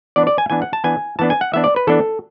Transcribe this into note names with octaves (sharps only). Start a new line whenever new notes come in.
E3 B3 D4 D5
D5
G#5
E3 B3 D4 G#5
F#5
A5
E3 B3 D4 G#5
E3 B3 D4 A5
G#5
F#5
E3 B3 D4 E5
D5
B4
E3 B3 D4 A4